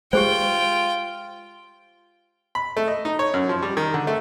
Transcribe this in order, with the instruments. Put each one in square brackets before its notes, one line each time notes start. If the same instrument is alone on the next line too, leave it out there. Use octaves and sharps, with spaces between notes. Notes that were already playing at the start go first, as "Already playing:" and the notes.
[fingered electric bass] G#3 [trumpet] F4 [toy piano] G4 G#4 C5 [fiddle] G5
[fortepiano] B5
A3
D#5
D#4
C#5
F#2
F3
G3
D#3
D3
A3